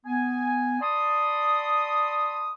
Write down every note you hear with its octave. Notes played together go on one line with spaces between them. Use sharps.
B3 G#5
D5 A5 B5 C6 D#6